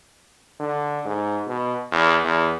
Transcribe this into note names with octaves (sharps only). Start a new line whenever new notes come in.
D3
G#2
B2
E2
E2